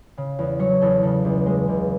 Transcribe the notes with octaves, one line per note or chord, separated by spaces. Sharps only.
C#3
E2
F#3 C#5
E2 A4
C#3 A4
C#2
G#3
C#2